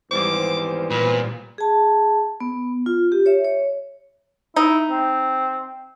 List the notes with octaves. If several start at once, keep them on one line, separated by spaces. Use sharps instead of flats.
G#1 E2 G3 C5 D6
A#2 B4
G#4 A5
B3
F4
G4
C#5 E5
C#5
D#4 E4
C4